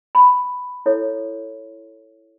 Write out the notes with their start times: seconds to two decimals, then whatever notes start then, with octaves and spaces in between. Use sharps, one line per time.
0.15 B5
0.86 E4 A4 C#5